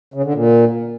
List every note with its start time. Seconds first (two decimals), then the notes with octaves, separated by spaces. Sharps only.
0.14 C#3
0.24 D3
0.34 A#2